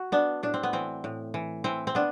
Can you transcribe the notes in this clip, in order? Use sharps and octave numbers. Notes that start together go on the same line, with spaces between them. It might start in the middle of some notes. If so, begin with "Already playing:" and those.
Already playing: F#4
B3 D4
A2 D4
C4
B3
E3 C4
A2
E3
E3 C4
C4
B3 D4